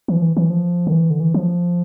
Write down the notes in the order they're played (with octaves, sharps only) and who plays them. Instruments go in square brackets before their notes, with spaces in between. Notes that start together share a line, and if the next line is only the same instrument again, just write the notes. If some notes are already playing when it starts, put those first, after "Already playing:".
[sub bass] E3
F3
E3
E3
F3
D3
E3
D3
E3
F3